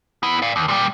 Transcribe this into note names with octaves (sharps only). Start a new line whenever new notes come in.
B3 E4
D5 F5
D#2
A#2 G3